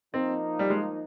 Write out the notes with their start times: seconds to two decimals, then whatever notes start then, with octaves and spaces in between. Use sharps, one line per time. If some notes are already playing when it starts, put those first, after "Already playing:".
0.14 F3 A#3 C4 D#4
0.59 G3
0.70 G#3